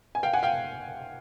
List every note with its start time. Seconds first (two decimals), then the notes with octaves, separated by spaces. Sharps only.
0.15 G#5
0.23 F5 G5
0.33 F#5 G#5
0.43 F5 G5